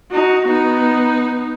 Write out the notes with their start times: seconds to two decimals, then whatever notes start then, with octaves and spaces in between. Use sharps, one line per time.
0.11 D#4 F#4
0.48 B3 D#4